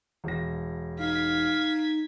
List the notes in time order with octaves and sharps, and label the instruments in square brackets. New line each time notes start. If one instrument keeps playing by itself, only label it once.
[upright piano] E1 A#6
[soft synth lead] D#4 [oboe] F5 [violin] G#6 B6